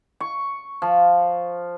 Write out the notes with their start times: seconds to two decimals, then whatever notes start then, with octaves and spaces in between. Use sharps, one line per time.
0.20 C#6
0.82 F3